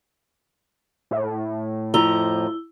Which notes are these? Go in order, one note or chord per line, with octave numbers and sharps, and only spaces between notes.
A2
F2 F3 E4 A#5 E6 G7